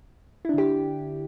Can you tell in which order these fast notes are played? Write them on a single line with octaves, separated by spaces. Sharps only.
E4 D4 D3 G4